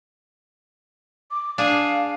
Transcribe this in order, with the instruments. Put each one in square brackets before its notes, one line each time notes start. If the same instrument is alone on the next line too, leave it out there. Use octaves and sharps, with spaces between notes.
[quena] D6
[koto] D4 G#4 [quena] F5